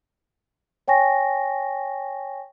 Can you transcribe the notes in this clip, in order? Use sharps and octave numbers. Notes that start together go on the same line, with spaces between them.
C#5 G5 G#5 C#6 A#6